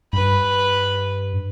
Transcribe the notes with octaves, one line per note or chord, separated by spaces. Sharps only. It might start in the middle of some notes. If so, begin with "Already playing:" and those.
G2 B4 B5